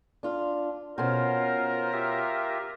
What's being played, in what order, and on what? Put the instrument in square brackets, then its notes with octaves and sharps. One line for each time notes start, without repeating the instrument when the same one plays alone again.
[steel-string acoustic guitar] D4 F4
[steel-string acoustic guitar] B2 C#4 [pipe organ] F4 C5 [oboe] A#4
[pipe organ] F4 G4 E5